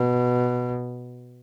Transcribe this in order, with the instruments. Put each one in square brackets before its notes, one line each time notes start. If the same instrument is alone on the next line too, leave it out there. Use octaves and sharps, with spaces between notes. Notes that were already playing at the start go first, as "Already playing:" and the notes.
Already playing: [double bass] B2